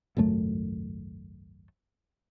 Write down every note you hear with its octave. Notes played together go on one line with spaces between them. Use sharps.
G#1 C#2 F#2 A3